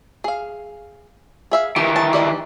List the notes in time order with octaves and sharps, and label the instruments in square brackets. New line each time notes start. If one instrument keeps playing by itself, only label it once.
[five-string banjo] G#4 F5
G#4 E5 F5
[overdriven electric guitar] D#3 E3 [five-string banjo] G4
[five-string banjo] A5
G4 D5 D#5